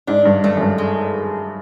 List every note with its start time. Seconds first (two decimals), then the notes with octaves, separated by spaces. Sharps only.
0.07 G#2 D4
0.25 G2
0.44 G2 A3
0.56 F#2
0.61 G2
0.78 G#3